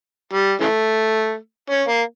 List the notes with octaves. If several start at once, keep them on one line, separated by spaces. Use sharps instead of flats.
G3
C#3 E3 A3
C#4
A#3